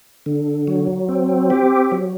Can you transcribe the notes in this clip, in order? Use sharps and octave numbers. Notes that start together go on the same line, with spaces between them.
D3
F#3
C4
G4
F#3